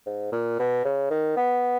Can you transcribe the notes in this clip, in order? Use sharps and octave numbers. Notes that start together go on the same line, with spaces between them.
G#2
A#2
B2
C#3
D#3
B3